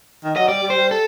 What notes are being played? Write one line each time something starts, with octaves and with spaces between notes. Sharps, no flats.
D#3
F#3 D#5
G3 D5
G3
C5
G3
A4